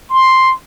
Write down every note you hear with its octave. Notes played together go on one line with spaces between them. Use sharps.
C6